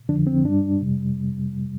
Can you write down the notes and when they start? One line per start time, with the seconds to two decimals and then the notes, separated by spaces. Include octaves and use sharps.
0.09 F2 D3 F3 D4
0.27 C4
0.44 G2 G3 D4
0.80 F2 C3 G3